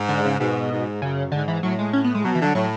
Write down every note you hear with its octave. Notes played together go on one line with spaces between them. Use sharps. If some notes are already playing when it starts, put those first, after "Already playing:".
Already playing: G#2
D3
C#3
G#2 B2
G#2
F#2 C#3
G#2 D3
E3
A2 F#3
G#3
C#4
B3
G#3
B2 F#3
E3
D3 F#3
A2 F#3